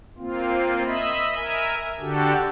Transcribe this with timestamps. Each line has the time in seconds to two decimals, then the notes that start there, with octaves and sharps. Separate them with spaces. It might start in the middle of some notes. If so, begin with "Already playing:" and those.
0.18 A#3 C4 F4
0.86 D#5 E5 B5
1.36 A#4 E5 G#5
2.00 D3 D4 F#4 G4 A4